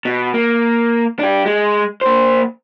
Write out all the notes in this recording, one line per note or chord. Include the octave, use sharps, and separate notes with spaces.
B2
A#3
D4 G4
G#3
A#3 C5